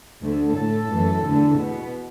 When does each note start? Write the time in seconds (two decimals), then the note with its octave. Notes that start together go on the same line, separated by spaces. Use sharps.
0.21 D2 D3 A3
0.55 A2 A3 A4
0.90 F#2 E3 A3
1.24 E2 D3 A3
1.59 B2 B3